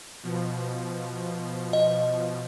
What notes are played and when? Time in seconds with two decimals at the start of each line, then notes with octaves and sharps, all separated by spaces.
0.23 B2 F3
1.73 D#5